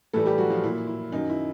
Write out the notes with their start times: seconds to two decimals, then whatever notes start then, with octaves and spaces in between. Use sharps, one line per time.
0.13 A2 E3 G3 A3 A4
0.26 G3 G4
0.38 F#3 F#4
0.50 F3 F4
0.63 A#2 F#3 E4
0.87 E4
1.12 F#2 D#3 F#3 D#4
1.30 E4